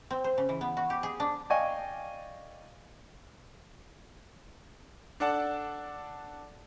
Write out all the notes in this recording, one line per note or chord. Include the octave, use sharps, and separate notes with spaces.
C4
C5
C#3
E3
B3
F#4
G4
G#4
D4
D5 D#5 F5 G5 G#5 C#6
D4 A4 D5 F#5 A5